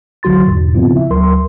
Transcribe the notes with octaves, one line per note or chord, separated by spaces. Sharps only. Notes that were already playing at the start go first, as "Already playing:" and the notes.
B1 D3 F#3 F#4 C6 A6
G1 E2 G#2 B2
C#3 F3 B3 C4 E4 F4
E5
D2 F#3 A#4 C6